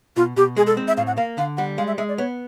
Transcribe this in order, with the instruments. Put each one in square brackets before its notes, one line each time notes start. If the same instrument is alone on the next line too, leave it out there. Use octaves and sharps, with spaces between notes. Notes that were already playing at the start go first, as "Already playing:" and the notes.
[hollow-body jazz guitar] B2 [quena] F4
[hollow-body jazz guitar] B2 [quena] G4
[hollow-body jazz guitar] G#3 [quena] G#4
[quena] A4
[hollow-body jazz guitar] C4
[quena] E5
[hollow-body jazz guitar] A2 [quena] F5
[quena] F#5
[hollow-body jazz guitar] A#3 [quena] F5
[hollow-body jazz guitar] D3 [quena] F5
[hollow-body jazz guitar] G3 [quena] F#5
[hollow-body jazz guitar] G#3 [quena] F5
[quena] E5
[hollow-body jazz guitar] G#3 [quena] E5
[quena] D5
[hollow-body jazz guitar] B3 [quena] C#5